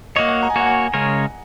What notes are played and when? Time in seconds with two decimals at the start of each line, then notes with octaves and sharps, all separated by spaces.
0.16 A#3 F#4 C#5 D#5
0.29 F#5
0.43 A#5
0.50 G#5
0.56 A#3 F#4 C#5 F#5
0.67 G#5
0.94 C#3 G#3 C#4 A#4 C#5